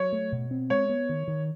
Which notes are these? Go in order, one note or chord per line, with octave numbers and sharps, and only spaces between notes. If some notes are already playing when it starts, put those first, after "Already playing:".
Already playing: F#3 C#5
A3
B2
C4
G#3 C#5
B3
D#3
D#3